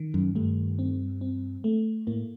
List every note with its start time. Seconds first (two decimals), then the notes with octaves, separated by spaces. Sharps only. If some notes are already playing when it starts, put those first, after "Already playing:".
Already playing: D#3
0.14 F#2
0.35 G2 A3
0.79 C4
1.21 C4
1.64 A3
2.07 A2 A#3